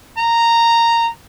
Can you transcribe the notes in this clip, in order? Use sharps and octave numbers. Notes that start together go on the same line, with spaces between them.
A#5